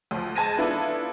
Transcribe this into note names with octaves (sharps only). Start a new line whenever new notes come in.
D2 F3
G#2 A5 G#6 A#6 D#7
B3 D4 E4 F4 A4